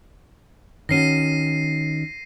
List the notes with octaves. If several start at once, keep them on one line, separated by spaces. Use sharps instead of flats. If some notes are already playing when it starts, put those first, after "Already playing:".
D#3 C#4 F#4 A#6 C7 D#7